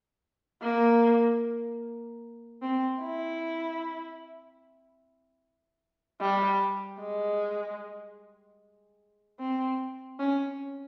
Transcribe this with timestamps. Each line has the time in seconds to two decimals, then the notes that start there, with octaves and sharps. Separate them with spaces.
0.62 A#3
2.62 C4
3.01 E4
6.21 G3
7.00 G#3
9.39 C4
10.19 C#4